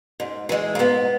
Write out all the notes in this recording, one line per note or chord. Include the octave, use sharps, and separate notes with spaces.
G#2
E3 G#3
A#3
G#2 B3